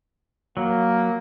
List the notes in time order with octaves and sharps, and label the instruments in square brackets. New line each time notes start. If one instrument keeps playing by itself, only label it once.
[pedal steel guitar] F#3 [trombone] A#3